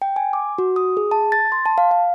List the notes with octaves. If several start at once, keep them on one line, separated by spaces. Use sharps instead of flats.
G5
G#5
D6
F#4
D#6
G#4
A5
A6
C6
A5
F5
F5